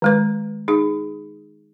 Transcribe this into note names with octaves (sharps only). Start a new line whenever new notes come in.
D#3 G#3 B4
D#4 G#4